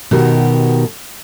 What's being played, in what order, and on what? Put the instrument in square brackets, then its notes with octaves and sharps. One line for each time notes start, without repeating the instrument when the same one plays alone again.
[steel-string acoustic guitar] B2 D#3 F#4 G4 A#4